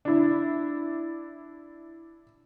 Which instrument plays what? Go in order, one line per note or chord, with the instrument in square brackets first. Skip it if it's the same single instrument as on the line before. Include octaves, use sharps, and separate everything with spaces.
[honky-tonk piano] D4 E4